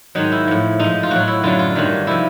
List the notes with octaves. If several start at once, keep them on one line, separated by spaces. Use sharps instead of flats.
G#2 D#3 F#3 D#4
E4
A2 F3
G#2 F3 D#4
F4
A2 F#3 F#4
E4
F#2 D3 F#3 F4
F4
G2 D#3 F#3
C3 F3 E4